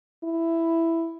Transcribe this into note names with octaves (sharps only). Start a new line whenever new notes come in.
E4